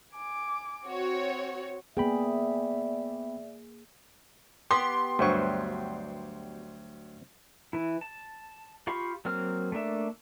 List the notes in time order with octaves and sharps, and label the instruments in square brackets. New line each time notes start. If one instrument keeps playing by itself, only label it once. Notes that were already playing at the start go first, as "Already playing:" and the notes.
[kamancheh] G#5 D6
[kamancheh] C4 [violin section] F#4 C#5
[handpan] A#3 G#4 [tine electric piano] B3 G5 B5 [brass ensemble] D5 E5
[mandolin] B3 G4 [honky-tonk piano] C6
[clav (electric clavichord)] D2 F#3 [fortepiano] G2 C5 C#6
[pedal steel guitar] E3 E4
A5
F4 G4 F5 B5 C#6
F#3 A#3 C4 F6
A3 A#3 D4 E5